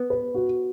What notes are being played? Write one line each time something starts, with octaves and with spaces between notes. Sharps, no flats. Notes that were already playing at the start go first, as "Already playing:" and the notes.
Already playing: B3
B4
F#4